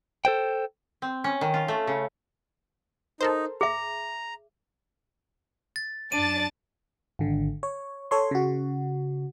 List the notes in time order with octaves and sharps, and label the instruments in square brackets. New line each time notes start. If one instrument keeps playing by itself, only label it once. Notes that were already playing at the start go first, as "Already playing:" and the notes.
[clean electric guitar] A4 C5 G5
[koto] C4
C#4
D#3
F4
A3
C#3
[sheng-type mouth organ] D#4 [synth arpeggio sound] A4 A#4 C5
[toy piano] G#4 E5 [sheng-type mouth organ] A#5
[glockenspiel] A6
[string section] F#2 A5 A6 [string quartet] D4 [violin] D5 [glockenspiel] D#7
[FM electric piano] G#1 D3
C#5
A4 C#5 C6
C#3 F#4